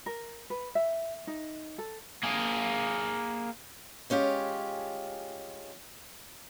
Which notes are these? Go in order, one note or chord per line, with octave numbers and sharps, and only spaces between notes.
A#4
B4
E5
D#4
A4
A#3 G#4
G#3 C#4 F4 G4